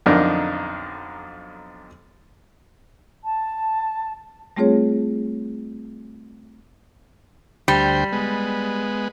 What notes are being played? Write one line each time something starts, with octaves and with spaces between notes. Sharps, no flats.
B1 F2 D3 D4 D#4 A#4
A5
G3 A3 C4 F4 G#4 C#5
D2 G3 C5 G5
G#3 B3